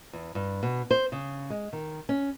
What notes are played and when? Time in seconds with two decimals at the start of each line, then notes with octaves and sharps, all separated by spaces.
0.13 E2
0.35 G2
0.63 B2
0.91 C5
1.12 C#3
1.50 G#3
1.73 D#3
2.09 C#4